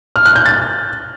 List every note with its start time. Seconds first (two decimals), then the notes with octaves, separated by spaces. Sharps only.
0.16 F6
0.26 F#6
0.36 G6
0.46 A6